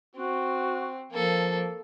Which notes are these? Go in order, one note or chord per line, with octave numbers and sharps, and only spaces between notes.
C4 F#4
F3 A#3 A4